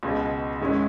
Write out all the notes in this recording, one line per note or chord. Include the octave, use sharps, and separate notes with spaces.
C#2 B2 G#3
G#2 D#3 G#3 C#4 E4